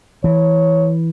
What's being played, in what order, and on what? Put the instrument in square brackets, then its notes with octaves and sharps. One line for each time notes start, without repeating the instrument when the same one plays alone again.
[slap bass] E3 [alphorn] C#5